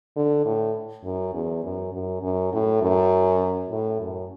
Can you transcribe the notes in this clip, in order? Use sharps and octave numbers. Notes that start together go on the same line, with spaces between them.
D3
A2
F#2
E2
F#2
F#2
F#2
A2
F#2
A2
F#2